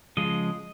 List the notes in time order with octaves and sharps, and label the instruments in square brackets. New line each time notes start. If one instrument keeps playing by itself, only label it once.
[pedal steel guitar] C#3 F3 G#3 D#5